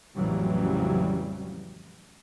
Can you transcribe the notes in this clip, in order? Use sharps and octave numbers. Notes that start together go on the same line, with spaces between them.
A1 F2 C#3 E3 F#3 G3